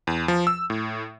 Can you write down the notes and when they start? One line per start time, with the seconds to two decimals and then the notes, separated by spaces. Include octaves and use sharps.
0.07 E2
0.28 F3
0.47 E6
0.70 A2